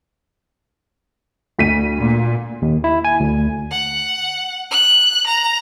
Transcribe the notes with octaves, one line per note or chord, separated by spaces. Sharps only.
D2 B6 D#7
A#2
D#2
E4
G#5
D2
F#5
F#6
A#5